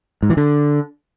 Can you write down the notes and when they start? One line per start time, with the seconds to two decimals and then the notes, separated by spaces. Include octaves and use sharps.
0.23 G#2
0.30 E3
0.37 D3